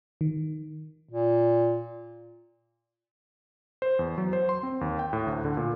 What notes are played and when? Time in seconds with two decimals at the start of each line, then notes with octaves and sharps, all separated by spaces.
0.21 D#3
1.10 A#2
3.82 C5
3.99 E2
4.18 F#3
4.33 C5
4.49 C6
4.63 C4
4.81 D#2
4.99 G5
5.13 A2
5.27 D2
5.45 D3
5.57 A#2